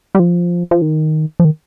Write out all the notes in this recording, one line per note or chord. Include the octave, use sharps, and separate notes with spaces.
G3
F3
F3
D#3
F3
D#3